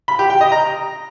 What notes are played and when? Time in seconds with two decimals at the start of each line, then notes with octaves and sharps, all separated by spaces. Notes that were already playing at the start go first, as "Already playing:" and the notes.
0.08 B5
0.19 G4
0.30 G5
0.41 D#5
0.52 A#5